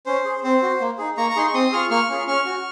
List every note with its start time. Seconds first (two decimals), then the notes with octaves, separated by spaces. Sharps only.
0.06 C#4 C5
0.25 G#4
0.43 C4 C5
0.62 F#4
0.80 A#3
0.98 D#4 G#4
1.17 A#3 A#5 C#6
1.30 A#5
1.36 D#4 G#4 C6
1.47 C#6
1.54 C4 C6 D#6
1.72 F4 G#4 C#6 F6
1.90 A#3 C#6 F6
2.09 C#4 F4 G#4
2.27 C#4 C#6 F6
2.46 F#4